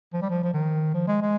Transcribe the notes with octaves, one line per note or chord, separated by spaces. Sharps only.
F3
G3
F3
F3
D#3
F3
G#3
G#3